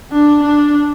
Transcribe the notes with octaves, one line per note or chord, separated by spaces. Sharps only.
D4
D4